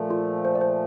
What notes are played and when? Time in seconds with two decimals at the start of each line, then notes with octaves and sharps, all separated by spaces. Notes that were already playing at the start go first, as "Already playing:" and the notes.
Already playing: A#2 F3 A3
0.10 F4
0.45 C5
0.55 D5
0.61 C5